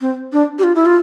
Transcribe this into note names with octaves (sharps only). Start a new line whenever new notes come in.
C4
D4
G4
F4
E4
F4